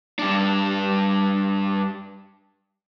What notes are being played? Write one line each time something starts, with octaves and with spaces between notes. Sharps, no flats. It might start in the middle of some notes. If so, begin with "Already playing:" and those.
G2 D4